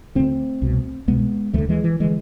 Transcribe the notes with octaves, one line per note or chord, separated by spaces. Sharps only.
D2 D3 A3 C4
C2 B2
C2 B2 G#3 B3
D2 D3 F3 A3
E3 G#3
E3
D3 E3 G#3